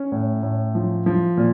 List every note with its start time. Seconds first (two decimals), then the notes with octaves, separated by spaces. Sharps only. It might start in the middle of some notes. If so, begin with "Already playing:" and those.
Already playing: C#4
0.12 A2
0.43 A2
0.75 F3
1.06 F3
1.37 A#2